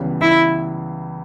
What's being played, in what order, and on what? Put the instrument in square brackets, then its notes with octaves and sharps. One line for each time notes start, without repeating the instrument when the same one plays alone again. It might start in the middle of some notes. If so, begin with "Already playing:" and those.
Already playing: [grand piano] C#2 C#3 E3 G3 B3
[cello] E4